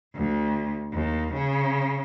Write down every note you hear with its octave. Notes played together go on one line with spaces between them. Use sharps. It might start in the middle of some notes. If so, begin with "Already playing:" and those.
D2
D#2
C#3